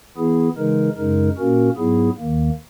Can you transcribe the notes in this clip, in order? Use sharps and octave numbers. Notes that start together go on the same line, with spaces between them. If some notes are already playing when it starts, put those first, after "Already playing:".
E3 B3 E4 G#4
C#3 E3 G#3 D#4 A#4
F#2 C#3 G#3 D#4 A#4
A#2 A#3 C#4 F#4 A#4
G#2 F#3 B3 E4 G#4
D#2 D#3 A#3